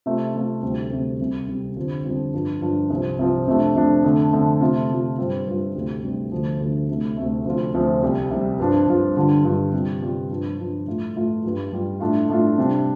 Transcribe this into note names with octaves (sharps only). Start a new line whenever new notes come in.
C3 A3 F4
C3 A3 F4
D2 C3 G3 C4
D2 C3 G3 C4
C2 C3 G3
C2 C3 G3
F2 D3 G3 C4 F4
F2 D3 G3 C4 F4
G2 F3 D4 F4
G2 F3 D4 F4
C2 C3 F3 C4 F4
C2 C3 F3 C4 F4
F2 C3 F3 A3 D4
F2 C3 F3 A3 D4
F2 D3 A3
F2 D3 A3
C3 A3 F4
C3 A3 F4
G2 G3 C4 F4
G2 G3 C4 F4
D2 C3 G3 C4
D2 C3 G3 C4
D2 D3 F3
D2 D3 F3
D2 C3 A3
D2 C3 A3
D2 C3 F3 C4 F4
D2 C3 F3 C4 F4
C2 C3 G3
C2 C3 G3
G2 F3 D4 F4
G2 F3 D4 F4
G2 D3 G3 D4 F4
G2 D3 G3 D4 F4
C3 G3 F4
C3 G3 F4
G2 F3 D4 F4
G2 F3 D4 F4
A2 A3 F4
A2 A3 F4
G2 G3 F4
G2 G3 F4
A2 A3 D4 F4
A2 A3 D4 F4
C3 G3 D4